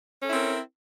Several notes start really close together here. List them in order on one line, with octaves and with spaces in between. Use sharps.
C#4 A4 E4 C4 A#4